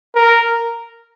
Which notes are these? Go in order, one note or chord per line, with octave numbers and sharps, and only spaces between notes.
A#4